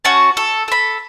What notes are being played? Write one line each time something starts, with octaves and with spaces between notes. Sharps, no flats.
C#4 F#4 A5
A4
A4 B5